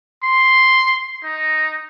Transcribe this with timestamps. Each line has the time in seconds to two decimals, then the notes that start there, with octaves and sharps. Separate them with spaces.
0.24 C6
1.24 D#4